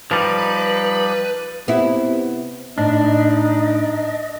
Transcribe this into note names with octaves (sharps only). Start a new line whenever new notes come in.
F3 G3 D#4 B4
C3 B3 E4
A2 D4 D#4 D#5